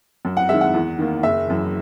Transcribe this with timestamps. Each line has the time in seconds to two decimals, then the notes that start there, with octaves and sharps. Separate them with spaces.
0.25 F#2
0.37 F#5
0.49 D#3 G#3 E5
0.61 F#5
0.74 E2
0.99 D#3 A#3
1.23 F#1 E5
1.48 F#2 E3